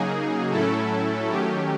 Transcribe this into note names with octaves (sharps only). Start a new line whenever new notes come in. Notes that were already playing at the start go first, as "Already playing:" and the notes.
Already playing: C#3 F#3 A#3 D#4 G#4
A2 F#3 A3 C#4 E4 A4
D#3 F#3 A3 C#4 G4